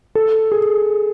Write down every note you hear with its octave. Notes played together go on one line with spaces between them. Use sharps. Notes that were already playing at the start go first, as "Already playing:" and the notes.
A4
G#4